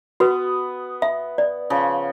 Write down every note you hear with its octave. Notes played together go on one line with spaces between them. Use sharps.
B3 F#4 B4
E5
D5
C#3 F3